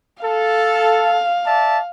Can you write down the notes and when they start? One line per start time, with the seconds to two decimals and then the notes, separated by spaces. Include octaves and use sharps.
0.22 A4 F5
1.45 D5 E5 A5